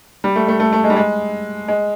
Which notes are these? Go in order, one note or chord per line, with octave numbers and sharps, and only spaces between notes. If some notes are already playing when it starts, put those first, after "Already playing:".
G3
A3
A3
A3
A3
G#3
G3
G#3
G#3